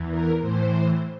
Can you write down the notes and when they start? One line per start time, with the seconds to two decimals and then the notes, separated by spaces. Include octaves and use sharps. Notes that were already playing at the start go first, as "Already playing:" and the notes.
Already playing: E2 E3
0.10 A#4
0.41 A2 E3 C5